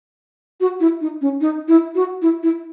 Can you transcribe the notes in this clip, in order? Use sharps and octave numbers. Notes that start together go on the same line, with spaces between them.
F#4
E4
D#4
C#4
D#4
E4
F#4
E4
E4